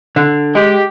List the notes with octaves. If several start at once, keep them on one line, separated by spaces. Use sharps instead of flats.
D3
G#3 G4